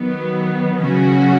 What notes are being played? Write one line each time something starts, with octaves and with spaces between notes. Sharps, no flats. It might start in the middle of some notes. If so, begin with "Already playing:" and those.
Already playing: D#3 F#3 B3
C#3 F#3 C#4 F#4